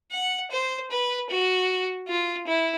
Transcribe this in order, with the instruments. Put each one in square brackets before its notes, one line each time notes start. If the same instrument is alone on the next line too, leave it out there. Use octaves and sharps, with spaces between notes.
[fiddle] F#5
C5
B4
F#4
F4
E4